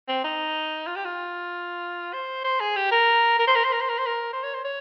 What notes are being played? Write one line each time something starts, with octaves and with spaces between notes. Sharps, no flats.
C4
D#4
F4
G4
F4
C5
C5
G#4
G4
A#4
A#4
C5
A#4
C5
A#4
C5
A#4
C5
A#4
C5
C#5
C5
C#5